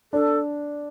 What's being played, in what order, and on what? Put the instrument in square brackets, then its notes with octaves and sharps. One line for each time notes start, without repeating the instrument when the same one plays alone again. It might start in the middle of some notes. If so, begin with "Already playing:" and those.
[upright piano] D4 [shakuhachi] A4